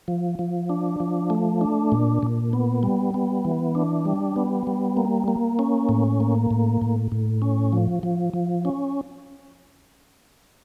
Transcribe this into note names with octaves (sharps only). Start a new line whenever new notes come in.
F3
F3
D4
F3
A3
D4
A#2
A#2
B3
G3
B3
E3
D4
G3
B3
G3
A#3
A#3
C#4
A2
A#3
A2
A2
A2
C#4
F3
F3
F3
C#4